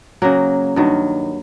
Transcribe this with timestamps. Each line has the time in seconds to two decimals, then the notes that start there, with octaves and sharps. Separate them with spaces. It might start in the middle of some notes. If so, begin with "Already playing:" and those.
0.22 C#3 F#3 A#3
0.76 G2 D#3 F#3